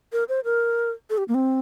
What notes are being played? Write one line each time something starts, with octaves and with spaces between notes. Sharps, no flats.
A#4
C5
A#4
A4
G4
A#3
C4